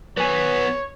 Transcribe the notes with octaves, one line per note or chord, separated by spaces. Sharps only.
F#3 B3 B4 C#5 G#5